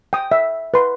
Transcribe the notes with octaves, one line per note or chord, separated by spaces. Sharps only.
G5 D#6
E5
B4 C6